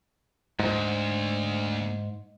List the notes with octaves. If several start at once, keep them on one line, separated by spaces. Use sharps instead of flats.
D2 G#2